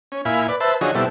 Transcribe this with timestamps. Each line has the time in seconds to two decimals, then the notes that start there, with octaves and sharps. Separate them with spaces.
0.12 C#4
0.25 A#2 E4 F5 G#5 B5
0.48 B4 D5
0.60 B4 C5 E5 A5
0.81 D3 F3 D#4 F#4 G#4 C#5
0.95 B2 G3 C4 E4 A4